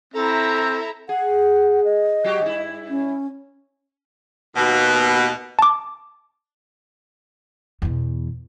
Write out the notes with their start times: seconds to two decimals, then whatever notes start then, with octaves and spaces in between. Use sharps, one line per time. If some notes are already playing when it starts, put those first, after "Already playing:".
0.14 C4 E4 A4 E5 A#5
1.09 G#4 F#5
1.85 D#5
2.24 F#3 F#4 G4
2.41 G2 E4
2.90 C#4
4.56 D#2 B2
5.59 A5 D6
7.82 E2 B2